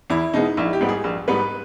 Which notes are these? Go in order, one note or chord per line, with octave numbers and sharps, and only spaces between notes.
E2 E4
B2 G#3 B3 D#4
A#1 E4
G4
G#2 G3 B3
G#4
A#1
G#2 G3 B3 B4